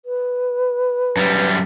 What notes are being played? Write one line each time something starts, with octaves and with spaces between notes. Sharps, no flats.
B4
F#2 G3